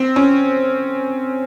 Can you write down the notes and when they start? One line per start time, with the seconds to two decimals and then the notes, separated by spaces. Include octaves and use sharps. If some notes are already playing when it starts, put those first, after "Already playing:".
Already playing: C4
0.16 C#4